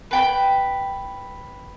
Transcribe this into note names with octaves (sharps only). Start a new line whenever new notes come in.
B4 G5 B5